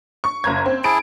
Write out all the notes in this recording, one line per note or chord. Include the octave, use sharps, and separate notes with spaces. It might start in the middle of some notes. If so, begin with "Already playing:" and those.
C#6
F#1 A#5 G#6
C4
E4 G#4 A5 D7